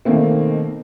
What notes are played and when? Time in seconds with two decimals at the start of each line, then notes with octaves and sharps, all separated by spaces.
0.05 B2 D#3 A3 A#3 C4